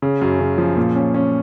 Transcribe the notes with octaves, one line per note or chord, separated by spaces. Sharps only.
C#3
F#2
C#3
F3
A#2
C#4
C#4